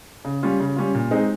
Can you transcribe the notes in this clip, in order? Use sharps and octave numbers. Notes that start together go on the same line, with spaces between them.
C#3
G3 C#4 F4
C#3
G3 C#4 F4
A#2
G#3 C4 D#4